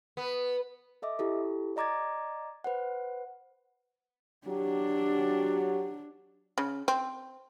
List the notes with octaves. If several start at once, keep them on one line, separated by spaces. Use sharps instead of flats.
B3
A4 D#5 E5 D6
E4 G4 A4
D5 D#5 A#5 D6 G#6 A6
B4 C5 F#5
F#3 D4 G4
C#3
C4